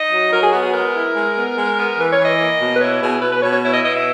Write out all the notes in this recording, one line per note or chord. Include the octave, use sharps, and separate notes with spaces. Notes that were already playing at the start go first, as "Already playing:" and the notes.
Already playing: D#4 D#5
F#3
F#3 A#4
G#4
B3 F#4
G#4
G#3 A#4
E4
G#3
B3
G#3
B3
E3 B4
C#5
E3
D#5
A#3
B2
B4
E4 C#5
B2 G#4
B2 B4
B4
B2 C#5
C#5
E4 C#5
D#5
B2 D#5
E5